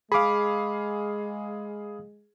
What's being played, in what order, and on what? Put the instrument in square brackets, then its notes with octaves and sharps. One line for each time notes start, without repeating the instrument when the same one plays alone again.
[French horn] G#3 [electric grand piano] G#4 F5 [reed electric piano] B5 D6